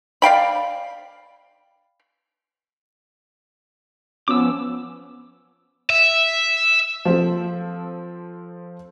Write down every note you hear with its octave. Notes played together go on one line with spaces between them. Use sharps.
D5 F5 G5 B5
F3 B3 C#4 D6 E6
E5
F3 C4 A4